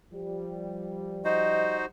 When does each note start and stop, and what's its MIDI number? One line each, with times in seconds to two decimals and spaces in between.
0.12 1.87 53
0.12 1.87 55
1.25 1.85 63
1.25 1.85 66
1.25 1.85 72
1.25 1.77 75